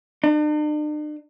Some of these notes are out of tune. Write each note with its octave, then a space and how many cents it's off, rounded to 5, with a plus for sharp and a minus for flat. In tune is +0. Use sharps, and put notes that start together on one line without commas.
D4 +45